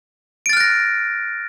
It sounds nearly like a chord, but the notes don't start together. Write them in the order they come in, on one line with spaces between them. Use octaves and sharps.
D7 A6 F6 F#6 A#6